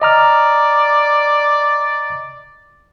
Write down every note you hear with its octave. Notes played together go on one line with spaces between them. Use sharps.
D5 D#5 A#5 F6